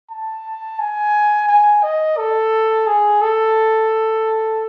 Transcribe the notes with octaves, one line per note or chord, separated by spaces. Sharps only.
A5
G#5
G#5
D#5
A4
G#4
A4